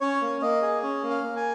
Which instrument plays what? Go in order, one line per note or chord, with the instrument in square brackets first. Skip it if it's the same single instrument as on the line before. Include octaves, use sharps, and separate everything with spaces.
[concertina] C#4 C#5
A#3
A#3 D#5
G#4
C#4
A#3
F5
A#3
G#5